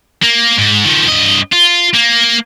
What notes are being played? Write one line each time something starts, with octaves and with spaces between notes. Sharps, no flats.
A#3
G#2
D#3 F3
G2 D#5
F4
A#3